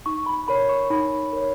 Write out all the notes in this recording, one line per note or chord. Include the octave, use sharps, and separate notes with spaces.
D#4 C#6
B5
A#4 C#5 B5
C#6
D#4 B5
A#4 C#5